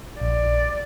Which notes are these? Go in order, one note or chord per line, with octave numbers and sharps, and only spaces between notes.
A#1 D5